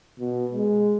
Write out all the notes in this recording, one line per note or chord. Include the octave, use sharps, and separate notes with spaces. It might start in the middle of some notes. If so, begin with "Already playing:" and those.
B2
G#3